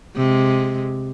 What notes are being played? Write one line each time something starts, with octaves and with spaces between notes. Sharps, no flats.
C3 G#3